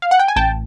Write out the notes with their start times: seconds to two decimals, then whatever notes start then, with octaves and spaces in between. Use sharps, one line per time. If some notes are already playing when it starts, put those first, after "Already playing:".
0.02 F5
0.11 F#5
0.19 G5
0.28 G#5
0.36 A1 G5 A5